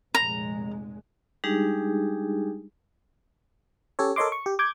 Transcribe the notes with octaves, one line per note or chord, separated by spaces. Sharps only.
F1 A#2 G#3 A#5
G3 G#3 D4 D#4 G4 G#4
C#4 G4 A4 C#5
A4 A#4 C#5 D#5 C6 D6
C#6
G4
D6 G6 G#6